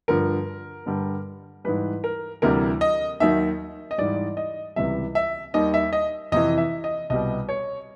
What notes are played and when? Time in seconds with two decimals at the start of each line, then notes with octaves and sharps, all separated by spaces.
0.08 G2 D3 F3 A#4
0.86 G2 D3 G3
1.64 G#2 E3 G3 B4
2.04 A#4
2.42 D2 C3 E3 G3 A#4
2.81 D#5
3.20 D#2 D#3 F#3 E5
3.91 D#5
3.98 G#2 E3 G3 D5
4.37 D#5
4.76 C#2 C3 E3 G3 E5
5.15 E5
5.54 D#2 D#3 G3 D#5
5.74 E5
5.93 D#5
6.32 F2 C3 E3 D#5
6.58 E5
6.84 D#5
7.10 C2 B2 G3 D#5
7.49 C#5